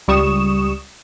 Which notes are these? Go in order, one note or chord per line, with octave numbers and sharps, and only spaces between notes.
C#2 G3 C#6 D#6 E7